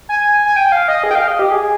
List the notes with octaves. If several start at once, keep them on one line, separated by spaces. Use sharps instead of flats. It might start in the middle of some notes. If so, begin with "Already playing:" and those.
G#5
G#5
G5
F5
D#5
G#4
G5
F5
D#5
G4
G#4